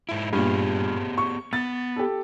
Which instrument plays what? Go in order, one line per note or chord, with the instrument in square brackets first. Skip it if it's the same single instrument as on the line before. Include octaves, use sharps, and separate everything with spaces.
[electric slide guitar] G#2 E4
[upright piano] G2 A#2 [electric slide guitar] B3 G4 G#4
[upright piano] C#6
[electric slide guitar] B3 [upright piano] A6
[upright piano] G4 A4